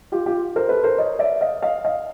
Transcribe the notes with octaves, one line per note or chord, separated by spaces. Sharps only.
F4 G4
F4 G4
A#4 C5
A4 B4
A#4 C5
C#5 D#5
D5 E5
D#5 F5
D#5 F5
D#5 F5